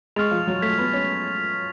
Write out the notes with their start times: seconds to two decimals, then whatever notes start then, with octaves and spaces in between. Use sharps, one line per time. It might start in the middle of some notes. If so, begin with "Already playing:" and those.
0.16 G#3 C#6 F6 A6 F7
0.31 F3
0.47 F#3
0.62 A3 G#6 B6 F7
0.78 B3
0.93 C#4